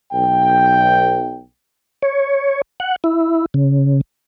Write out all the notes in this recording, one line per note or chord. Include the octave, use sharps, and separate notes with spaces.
B1 G5
C#5
F#5
E4
C#3